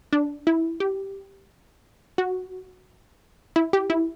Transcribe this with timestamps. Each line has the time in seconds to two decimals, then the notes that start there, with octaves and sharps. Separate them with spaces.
0.13 D4
0.47 E4
0.80 G4
2.18 F#4
3.56 E4
3.73 G4
3.90 E4